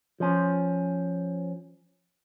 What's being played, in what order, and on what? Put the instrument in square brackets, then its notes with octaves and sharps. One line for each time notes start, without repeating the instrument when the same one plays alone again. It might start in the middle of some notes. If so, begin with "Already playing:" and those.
[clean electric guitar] F3 C#4